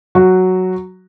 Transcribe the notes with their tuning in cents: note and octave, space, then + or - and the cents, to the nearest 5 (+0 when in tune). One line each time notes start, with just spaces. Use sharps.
F#3 +0 F#4 +0